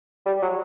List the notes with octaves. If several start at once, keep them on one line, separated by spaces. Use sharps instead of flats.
G3
F#3